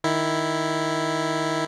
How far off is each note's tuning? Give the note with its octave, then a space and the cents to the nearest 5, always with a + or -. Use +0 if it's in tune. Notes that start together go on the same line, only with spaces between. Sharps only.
D#3 +0 E4 +0